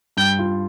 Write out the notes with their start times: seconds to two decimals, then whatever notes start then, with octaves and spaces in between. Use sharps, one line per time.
0.17 G2 G5
0.39 F4